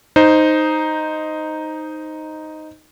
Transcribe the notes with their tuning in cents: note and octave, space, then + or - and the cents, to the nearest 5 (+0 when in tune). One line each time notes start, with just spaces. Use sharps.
D#4 +0 C5 +0